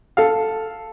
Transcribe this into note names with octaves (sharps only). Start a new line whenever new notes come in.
A4 F5